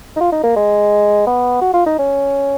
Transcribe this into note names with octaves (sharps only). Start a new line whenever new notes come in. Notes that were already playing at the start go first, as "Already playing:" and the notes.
D#4
F4
D#4
A#3
G#3
B3
F#4
F4
D#4
C#4